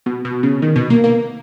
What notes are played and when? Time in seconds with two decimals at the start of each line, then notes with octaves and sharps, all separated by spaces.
0.06 B2
0.25 B2
0.43 C#3
0.62 D#3
0.76 B2
0.90 A#3
1.04 A#3